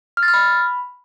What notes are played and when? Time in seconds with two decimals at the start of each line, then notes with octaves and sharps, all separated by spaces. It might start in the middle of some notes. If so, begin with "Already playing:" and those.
0.17 F6
0.23 A6
0.28 F6
0.34 B5